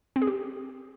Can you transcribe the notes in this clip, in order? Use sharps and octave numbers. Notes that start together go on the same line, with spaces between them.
C4
G#4
G4